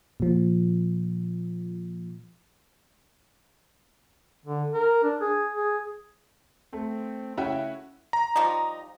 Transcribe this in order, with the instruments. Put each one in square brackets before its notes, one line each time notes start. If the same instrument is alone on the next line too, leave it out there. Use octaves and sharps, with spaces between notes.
[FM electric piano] A#2 F3
[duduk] D3
A#4
D4
G#4
G#4
[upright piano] A3 [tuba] C4
[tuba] C#3 [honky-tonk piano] C#4 E4 F#4 [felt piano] E5 G5
[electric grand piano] A#5
[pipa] F3 G3 D#4